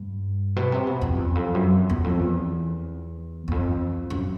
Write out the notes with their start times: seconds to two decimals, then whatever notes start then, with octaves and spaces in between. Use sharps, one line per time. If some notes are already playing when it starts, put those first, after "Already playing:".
Already playing: G2
0.56 B2
0.72 C3
0.87 B2
1.01 F2
1.16 E2
1.35 F2
1.55 F#2
1.90 E2
2.04 F2
2.19 E2
3.48 E2
3.51 F2
4.10 F#2